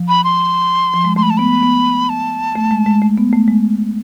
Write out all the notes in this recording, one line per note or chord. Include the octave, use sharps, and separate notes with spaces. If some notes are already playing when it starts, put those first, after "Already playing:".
Already playing: F3
B5
C6
F3
G#3
A3 C6
B5
A5
B3 B5
B3
A5
A3
G#3
G#3
A3
B3
A3
G#3